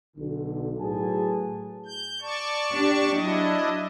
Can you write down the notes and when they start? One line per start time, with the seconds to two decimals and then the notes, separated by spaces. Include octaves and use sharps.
0.17 B1 D3
0.80 A2 F#3 G#4 B4 G#5 A5
1.86 G6
2.22 D5 A5 C#6
2.73 D4 G4
3.13 F#3 D4 E4 D#5